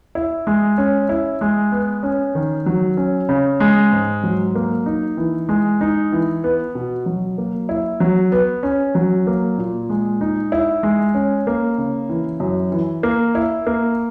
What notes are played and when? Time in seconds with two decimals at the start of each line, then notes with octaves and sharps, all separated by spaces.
0.15 E4
0.47 G#3
0.78 C#4
1.09 E4
1.41 G#3
1.72 B3
2.03 C#4
2.35 D#3
2.66 F#3
2.97 C#4
3.29 C#3
3.60 G#3
3.92 G#2
4.23 F#3
4.55 A#3
4.86 D#4
5.17 E3
5.49 G#3
5.81 D#4
6.12 E3
6.44 B3
6.75 B2
7.06 F#3
7.38 A#3
7.69 E4
8.00 F#3
8.32 B3
8.63 C#4
8.95 F#3
9.27 A#3
9.58 A#2
9.89 G#3
10.21 D#4
10.52 E4
10.83 G#3
11.14 C#4
11.47 A#3
11.78 C#3
12.09 E3
12.40 F#2
12.72 E3
13.03 A#3
13.35 E4
13.66 A#3